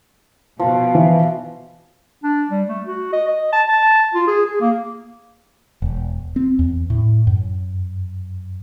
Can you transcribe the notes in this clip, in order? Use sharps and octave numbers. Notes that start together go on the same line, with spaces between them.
B2 F3
E3
D4
G3
A3
F#4
D#5
D#5
A5
A5
F4
G#4
G#4
A#3
E1
C4
E2
A2
F#2